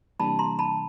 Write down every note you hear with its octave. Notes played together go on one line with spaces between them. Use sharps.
C3 E3 G3 A#3 D4 A5 B5
A#5 C6
A5 B5